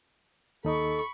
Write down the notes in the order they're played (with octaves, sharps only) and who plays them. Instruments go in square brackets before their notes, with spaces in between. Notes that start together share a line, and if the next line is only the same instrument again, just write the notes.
[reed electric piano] D#2 D#4 D#5 [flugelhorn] A4 [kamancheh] B5 C#6